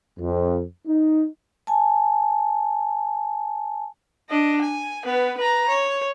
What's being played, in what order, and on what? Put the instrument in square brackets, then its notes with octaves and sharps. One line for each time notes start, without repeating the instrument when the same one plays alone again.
[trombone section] F2
D#4
[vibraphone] G#5 A5
[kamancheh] D4 D#5
G#5
B3 B4
B4 A#5
C#5